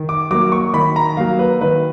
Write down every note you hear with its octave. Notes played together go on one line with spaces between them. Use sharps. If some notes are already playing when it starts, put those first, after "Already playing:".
Already playing: D#3
D6
F#3 A#3 D6
C#6
D#3 B5
A#5
F#3 A#3 F5
B4
D#3 B4